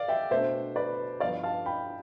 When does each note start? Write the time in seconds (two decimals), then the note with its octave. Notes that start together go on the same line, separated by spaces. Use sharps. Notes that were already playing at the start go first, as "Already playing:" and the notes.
Already playing: D5 F5
0.08 E5 G5
0.31 B2 A3 D4 C5 E5
0.76 B4 D5
1.20 G2 F3 B3 D5 F5
1.43 F5 A5
1.66 G5 B5